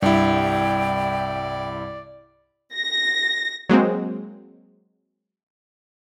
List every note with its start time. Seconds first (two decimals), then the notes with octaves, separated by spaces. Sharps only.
0.02 C2 G2 E4 D5 G5
2.75 A#6
3.69 F#3 G#3 A#3 C4